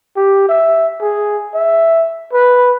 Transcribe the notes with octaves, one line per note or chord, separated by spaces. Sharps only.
G4
E5
G#4
E5
B4